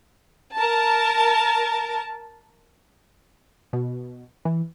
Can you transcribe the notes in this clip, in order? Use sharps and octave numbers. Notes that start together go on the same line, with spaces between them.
A#4 A5
B2
E3